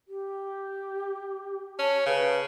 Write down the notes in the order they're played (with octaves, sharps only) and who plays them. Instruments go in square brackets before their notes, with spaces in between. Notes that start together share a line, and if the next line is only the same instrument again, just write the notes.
[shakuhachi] G4
[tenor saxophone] C#4 [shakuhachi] A5
[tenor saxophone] C#3 [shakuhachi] B4